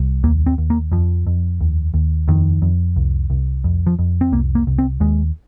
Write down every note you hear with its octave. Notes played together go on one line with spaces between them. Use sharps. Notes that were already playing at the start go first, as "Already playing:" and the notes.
Already playing: C2
D#2 A#3
C4
D#2
A#3
F2 F3
F2
D#2
D#2
F2 D#3
F2
C2
C2
F2
F3
F2
C4
C2 A#3
A#3
C2
C4
D#2 G#3